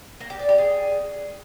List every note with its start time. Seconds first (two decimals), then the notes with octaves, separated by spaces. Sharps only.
0.20 A#3
0.30 G4
0.39 D5
0.49 G4
0.58 G#4